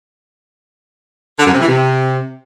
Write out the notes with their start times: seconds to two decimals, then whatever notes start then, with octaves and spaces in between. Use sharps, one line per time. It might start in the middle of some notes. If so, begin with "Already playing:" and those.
1.39 D3
1.46 F#2
1.53 C3
1.61 E3
1.68 C3